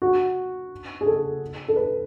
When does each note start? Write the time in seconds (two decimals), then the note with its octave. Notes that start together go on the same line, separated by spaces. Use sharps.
0.02 F#4
1.01 G#4
1.07 A4
1.68 A4
1.76 B4